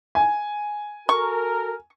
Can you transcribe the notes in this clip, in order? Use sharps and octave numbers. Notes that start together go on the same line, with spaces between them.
G#5
F#4 A4 A#4 C#6